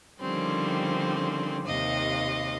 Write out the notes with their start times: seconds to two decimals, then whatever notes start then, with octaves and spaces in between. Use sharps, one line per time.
0.20 D3 D#3 F3 G3 C4 C#4
1.66 D#2 C3 D#5 F5